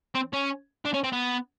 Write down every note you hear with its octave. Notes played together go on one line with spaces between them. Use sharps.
C4
C#4
D4
C#4
C4
B3